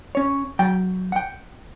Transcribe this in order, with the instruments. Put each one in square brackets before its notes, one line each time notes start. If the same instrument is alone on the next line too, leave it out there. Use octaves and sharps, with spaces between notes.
[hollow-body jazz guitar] C#4 C#5
F#3 G5
F#5 G5